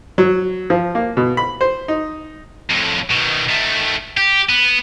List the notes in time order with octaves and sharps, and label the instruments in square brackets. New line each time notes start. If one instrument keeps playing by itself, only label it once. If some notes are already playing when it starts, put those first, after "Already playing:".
[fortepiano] F#3
F3
A#3
B2
B5
C5
D#4
[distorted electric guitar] F2 A2
B2 D#3
D#3 A3
G4
B3